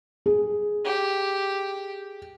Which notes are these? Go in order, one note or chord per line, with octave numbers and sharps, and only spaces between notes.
G#4
G4